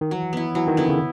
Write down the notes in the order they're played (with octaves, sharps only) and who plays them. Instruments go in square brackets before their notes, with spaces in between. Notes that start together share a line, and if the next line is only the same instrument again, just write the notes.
[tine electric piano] D#3
[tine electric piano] E3 [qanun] F#3
[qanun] B3 E4
[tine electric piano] E3 [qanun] F#3
[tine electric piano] D#3
[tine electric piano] D3 [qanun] B3 E4
[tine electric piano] C#3